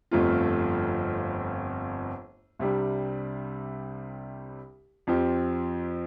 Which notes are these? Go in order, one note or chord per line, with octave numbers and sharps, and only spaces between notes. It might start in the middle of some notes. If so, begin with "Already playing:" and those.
G1 F2 F3 A3 F4
C2 C3 G3 D4
F2 F3 C4 G4